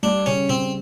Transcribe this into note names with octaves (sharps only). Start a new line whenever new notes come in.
G3 D4
C#3 C#4
C#3 C4